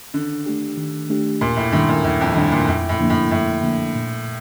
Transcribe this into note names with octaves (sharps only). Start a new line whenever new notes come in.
D3 D#3
A3 D4 G4
D#3
A3 D4 G4
D#2 A#2
A2
A2 D#3 G3 D4
A#2
D#2 A2
F2
A2 D#3 G3 D4
A#2
F2 A2
A2
D3 F3 A#3 D4
A2
F2 A2
D3 F3 A#3 D4
A#2